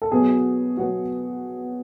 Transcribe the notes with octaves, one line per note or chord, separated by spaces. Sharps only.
A4
B2 F#3 B3 G#4
B2 F#3 B3 F#4